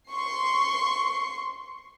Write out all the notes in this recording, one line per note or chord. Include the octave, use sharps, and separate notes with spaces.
C6 C#6 C7